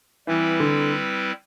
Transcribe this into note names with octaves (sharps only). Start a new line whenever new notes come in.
E3 G3 C4 E4 B4
D3